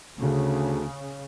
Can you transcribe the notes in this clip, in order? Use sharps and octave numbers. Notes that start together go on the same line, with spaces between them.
D2 C#3